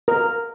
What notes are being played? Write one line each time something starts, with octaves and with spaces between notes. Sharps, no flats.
A#4